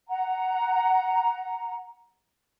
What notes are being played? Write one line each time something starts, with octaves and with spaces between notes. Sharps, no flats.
F#5 A#5